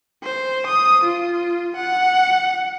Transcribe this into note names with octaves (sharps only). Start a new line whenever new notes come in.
C5
D#6
F4
F#5